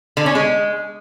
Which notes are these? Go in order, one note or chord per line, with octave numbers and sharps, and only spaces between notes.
D3
C#4
G#3